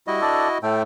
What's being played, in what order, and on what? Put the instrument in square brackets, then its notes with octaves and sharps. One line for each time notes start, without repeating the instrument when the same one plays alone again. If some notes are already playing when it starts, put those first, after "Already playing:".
[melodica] G3 [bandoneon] E4 F#4 D#5
[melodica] D4 A4 D5
[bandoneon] A2 A3 [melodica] A4 G5